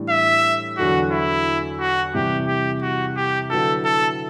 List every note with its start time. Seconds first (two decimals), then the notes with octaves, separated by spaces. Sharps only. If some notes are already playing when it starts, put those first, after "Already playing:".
Already playing: A2 E3 G3 D4
0.10 E5
0.78 E2 D3 F#3 F#4
1.12 E4
1.80 F#4
2.14 C3 E3 G3 G4
2.48 G4
2.82 F#4
3.16 G4
3.50 D3 F#3 B3 E4 A4
3.85 A4